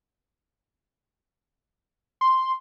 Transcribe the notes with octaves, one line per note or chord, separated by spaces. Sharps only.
C6